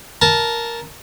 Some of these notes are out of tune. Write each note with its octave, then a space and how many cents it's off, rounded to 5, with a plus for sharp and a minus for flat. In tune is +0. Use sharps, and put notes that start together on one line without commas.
A#4 +0 A5 -10